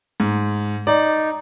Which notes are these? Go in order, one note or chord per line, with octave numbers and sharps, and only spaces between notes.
G#2
D#4 D5